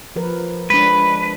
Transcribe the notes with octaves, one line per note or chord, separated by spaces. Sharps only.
F3 A#4 B4
G#3 D4 B4